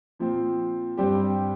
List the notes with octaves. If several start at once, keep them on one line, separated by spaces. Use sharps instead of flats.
A#2 F3 C4
G2 G3 C4 G4